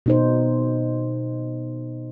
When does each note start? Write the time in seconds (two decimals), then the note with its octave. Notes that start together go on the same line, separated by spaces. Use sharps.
0.06 B2 D#4 C5